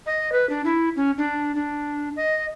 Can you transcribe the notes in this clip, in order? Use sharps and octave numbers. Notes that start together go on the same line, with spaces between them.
D#5
B4
D4
E4
C#4
D4
D4
D#5